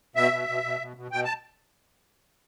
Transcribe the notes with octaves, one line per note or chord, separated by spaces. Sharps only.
B2 E5
B2
B2
B2
B2
B2
B2 G5
A5